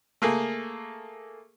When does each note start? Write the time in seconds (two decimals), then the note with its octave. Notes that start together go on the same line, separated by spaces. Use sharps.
0.22 A3 A#3 G#4